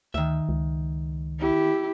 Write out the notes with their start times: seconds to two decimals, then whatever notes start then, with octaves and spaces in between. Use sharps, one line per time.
0.14 D2 D#3 E5
0.49 C#2
1.39 E4 G4